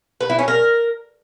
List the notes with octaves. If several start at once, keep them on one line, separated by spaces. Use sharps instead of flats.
B4
E4
C#4
A#4